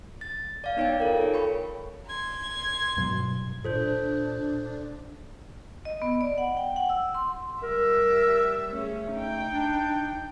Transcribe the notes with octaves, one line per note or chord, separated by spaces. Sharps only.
A6
D5 F5
B3 D#4 C#5 D5 G5
F4 A4 A#4
G#4 C#5
G5 B5 C#6
C6 G#6
G2 B2 F#3
A#2 D4 A4 C5 G6
D#5
B3
D5
F#5
G5
F#5
E6
C6
G3 A#4 E5
A3 C#4 G#4
D#4 G5
D4